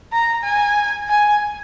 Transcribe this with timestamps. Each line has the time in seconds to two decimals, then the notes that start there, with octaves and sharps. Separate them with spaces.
0.12 A#5
0.44 G#5
1.09 G#5